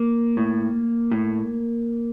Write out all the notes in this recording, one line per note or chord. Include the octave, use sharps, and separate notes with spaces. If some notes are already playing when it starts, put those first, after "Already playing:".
Already playing: A#3
A2
A2